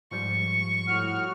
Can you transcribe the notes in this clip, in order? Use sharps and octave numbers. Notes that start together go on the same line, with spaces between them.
G#2 F3 G3 C#6
A2 F#4 F6